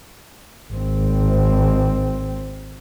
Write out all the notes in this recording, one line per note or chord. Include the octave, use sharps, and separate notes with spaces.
G#1 C4